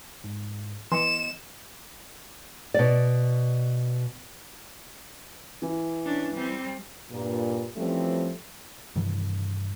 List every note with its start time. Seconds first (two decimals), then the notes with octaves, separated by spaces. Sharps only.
0.24 G#2
0.92 E3 B3 D#5 C6 C#7 E7
2.74 B2 D5
5.62 E3
6.05 C#4 D4
6.33 G3 C4
7.12 G2 A#2
7.76 E3 F3 G3 A3 C4 C#4
8.96 G2 C3 D#3 E3